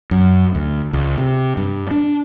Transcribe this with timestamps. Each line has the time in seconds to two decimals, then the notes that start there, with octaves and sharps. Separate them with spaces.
0.11 F#2
0.55 D2
0.93 C#2
1.18 C3
1.57 G2
1.91 D4